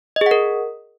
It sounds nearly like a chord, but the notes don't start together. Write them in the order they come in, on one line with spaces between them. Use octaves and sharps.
D#5 G#4 F#5 A#4